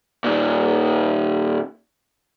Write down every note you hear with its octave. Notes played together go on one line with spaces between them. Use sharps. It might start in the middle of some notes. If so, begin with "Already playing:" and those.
A#2 D#3